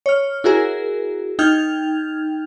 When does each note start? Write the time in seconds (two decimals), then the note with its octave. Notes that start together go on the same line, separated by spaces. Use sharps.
0.06 C#5 F6
0.44 E4 F#4 G#4 A#4
1.39 D#4 G5 F6 G6 G#6 F7